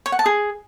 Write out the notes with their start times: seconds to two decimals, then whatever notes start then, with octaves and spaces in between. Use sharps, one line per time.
0.06 C#5
0.12 F#5
0.19 A5
0.26 G#4